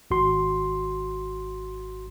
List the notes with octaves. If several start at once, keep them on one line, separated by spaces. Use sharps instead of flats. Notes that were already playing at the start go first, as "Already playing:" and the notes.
G#1 F#4 C6